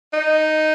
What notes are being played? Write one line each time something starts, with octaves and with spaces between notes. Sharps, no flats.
D#4